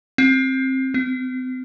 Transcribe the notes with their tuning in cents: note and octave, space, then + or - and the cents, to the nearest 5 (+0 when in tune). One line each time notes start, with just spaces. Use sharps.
C4 +15
C4 -40